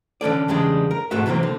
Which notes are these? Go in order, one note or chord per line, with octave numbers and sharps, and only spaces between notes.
D3 C#4 A4 D5
E2 C#3 G3 G#3 D4
A#4
B1 G#2 G#3 A3 F#4 E5
C3 E3 F#3 A#3 C4
D3